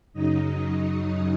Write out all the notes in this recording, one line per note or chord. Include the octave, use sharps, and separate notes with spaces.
F#2 C#3 F#3 D#4 D#5